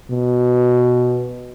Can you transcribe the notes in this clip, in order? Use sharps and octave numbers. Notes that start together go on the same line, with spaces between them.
B2